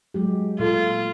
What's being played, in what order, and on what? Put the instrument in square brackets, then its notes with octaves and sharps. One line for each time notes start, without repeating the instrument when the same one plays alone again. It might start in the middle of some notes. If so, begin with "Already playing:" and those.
[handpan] F#3 G#3 G4
[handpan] A#2 A4 [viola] F4